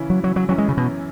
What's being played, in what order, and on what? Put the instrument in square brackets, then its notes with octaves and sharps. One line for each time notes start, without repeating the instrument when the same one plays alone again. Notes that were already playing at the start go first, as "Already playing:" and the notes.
Already playing: [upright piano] C#3 E3 C#4 E4
[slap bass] F#3
F#3
F#3
[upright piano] F#2 E3 C#4 E4 [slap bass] F#3
[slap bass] G#3
C#3
B2